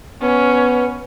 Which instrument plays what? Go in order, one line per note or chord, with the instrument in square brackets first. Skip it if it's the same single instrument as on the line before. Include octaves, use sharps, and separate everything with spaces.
[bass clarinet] B3 [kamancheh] C#4 [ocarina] B4